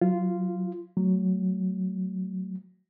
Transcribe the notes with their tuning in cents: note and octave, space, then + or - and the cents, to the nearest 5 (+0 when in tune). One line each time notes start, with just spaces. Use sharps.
F#3 -5 F4 -10
F#3 +10 A3 +0